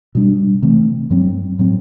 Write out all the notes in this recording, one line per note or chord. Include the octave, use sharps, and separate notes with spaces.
B2 G3 D4
C3 E3 A3 C4
G2 F#3 C4
A2 F#3 C4